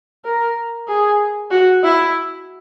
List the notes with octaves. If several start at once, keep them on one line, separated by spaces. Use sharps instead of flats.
A#4
G#4
F#4
E4